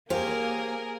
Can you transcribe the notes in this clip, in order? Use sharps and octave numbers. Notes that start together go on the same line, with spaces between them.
A#3 G4 G#4 A#4 C5 C#5 F5